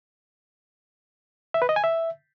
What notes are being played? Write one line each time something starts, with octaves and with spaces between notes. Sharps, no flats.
E5
B4
D#5
G#5
E5